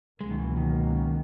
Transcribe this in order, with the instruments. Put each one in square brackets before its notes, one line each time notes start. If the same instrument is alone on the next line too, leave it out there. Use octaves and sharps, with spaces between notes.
[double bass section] C#2 B2 F#3 A#3 C#4 [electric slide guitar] G#3
[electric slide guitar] D#3
E3
D#3